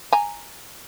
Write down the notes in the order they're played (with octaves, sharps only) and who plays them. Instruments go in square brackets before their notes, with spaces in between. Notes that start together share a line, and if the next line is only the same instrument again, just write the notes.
[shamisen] G#5 A#5